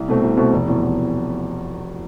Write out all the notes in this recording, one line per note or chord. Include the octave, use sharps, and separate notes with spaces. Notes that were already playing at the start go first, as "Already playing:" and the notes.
Already playing: C2
B2 A3 C4
C2
B2 A3 C4
F1
E2 B2
F1